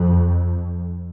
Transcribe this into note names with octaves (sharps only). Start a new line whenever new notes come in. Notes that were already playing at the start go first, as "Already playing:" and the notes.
Already playing: F2